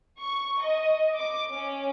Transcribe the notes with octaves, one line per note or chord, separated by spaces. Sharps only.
C#6
D#5
D6
C#4